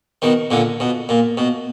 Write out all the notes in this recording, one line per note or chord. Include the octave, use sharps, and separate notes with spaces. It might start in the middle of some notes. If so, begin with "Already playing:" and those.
B2 D#3
A#2 D3
B2
A#2
B2